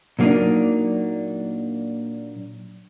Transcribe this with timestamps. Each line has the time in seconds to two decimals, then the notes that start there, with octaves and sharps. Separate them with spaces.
0.19 A#2 F#3 A#3 D4 D#4